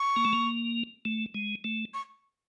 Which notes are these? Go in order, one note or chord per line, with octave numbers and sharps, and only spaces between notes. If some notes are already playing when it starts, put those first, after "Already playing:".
Already playing: C#6
A#3
A3
A#3
A3
G#3
A3
C#6